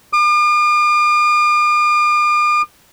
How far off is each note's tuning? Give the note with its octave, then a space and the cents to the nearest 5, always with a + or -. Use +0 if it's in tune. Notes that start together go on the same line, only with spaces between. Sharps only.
D6 +45